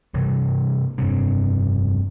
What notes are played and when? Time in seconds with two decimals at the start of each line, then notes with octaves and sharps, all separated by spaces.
0.14 C3 E3 G3
0.98 F1 G2 C3